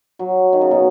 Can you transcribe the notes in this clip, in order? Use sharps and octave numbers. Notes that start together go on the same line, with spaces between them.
F#3
D#3
C#3
B2